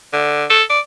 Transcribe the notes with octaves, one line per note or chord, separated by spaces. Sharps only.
D3
A4
D5